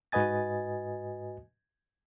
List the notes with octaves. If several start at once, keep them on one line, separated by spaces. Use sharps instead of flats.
G#2 F#4 B4 D#5 G#5 A6